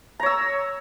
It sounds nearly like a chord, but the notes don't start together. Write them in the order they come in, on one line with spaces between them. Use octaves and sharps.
A#5 C#5 E6